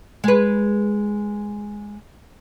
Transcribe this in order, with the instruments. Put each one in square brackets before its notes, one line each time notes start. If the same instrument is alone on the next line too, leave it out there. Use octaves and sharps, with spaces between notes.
[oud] G#3 B4